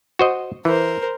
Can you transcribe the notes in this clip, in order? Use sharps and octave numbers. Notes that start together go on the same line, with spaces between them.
F#4 C5 D#5
E3 A#4 C5